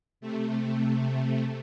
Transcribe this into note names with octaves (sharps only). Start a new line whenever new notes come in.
C3 A3